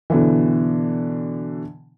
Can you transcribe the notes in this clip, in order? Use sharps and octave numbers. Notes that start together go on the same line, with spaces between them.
B2 D3 E3